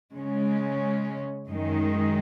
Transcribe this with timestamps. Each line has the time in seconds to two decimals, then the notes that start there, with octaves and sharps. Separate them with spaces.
0.17 C#3 G#3 C#4
1.48 F#2 D#3 G#3 D#4